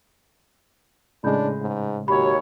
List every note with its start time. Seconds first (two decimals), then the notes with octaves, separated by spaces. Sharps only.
1.24 A2 C#3 G#3 D4 B5 G6
1.61 G#2
2.08 D#2 F#4 G4 C#5 B5